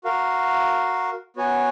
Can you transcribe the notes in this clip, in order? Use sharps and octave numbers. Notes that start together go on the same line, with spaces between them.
F#4 A#4 F5
B3 F#4 C#5 G#5